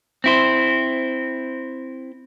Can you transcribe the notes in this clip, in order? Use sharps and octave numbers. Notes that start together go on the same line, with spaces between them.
C4 E4 C5